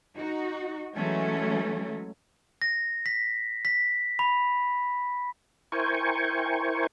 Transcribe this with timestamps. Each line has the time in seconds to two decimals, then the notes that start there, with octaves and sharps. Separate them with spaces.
0.17 D#4 F#4
0.96 E3 F#3 G#3 A3 C#4
2.62 A#6
3.06 B6
3.65 B6
4.19 B5
5.72 E4 A#4 C5 G5 G#5 C#6